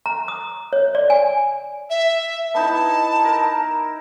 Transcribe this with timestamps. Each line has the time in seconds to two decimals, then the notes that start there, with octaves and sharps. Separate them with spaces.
0.06 A#5
0.28 D#6
0.73 C#5
0.95 D5
1.10 G#5
1.90 E5
2.54 B3 D#4 E4 A5
3.25 A#4